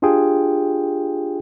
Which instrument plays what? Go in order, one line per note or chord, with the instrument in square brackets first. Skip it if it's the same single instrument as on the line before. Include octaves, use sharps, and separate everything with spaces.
[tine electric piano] D4 F4 G4 G#4 G5